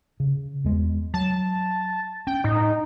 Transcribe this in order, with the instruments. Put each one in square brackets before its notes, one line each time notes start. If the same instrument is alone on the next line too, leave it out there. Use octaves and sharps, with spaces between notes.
[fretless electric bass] C#3
E2 G#3
[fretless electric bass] F#3 [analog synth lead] A5
[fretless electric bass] C#4 [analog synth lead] G5
[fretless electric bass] A2 [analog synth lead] D#4